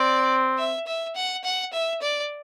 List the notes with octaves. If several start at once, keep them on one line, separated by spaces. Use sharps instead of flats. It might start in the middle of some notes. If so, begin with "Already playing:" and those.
Already playing: C4 D5
E5
E5
F#5
F#5
E5
D5